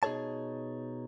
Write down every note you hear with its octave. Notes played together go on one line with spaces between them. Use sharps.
B2 D#4 G#4 A4 C#5 A5